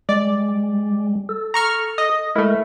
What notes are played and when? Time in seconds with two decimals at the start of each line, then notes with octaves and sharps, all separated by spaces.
0.09 G3 G#3 D5
1.29 A4
1.54 A#5 C#6 F6
1.98 D#5
2.36 G#3 A3 E4 A#4